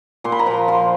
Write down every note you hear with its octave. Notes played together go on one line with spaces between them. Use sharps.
A#2 C6
B5
A#5
F3 B5
F3 C6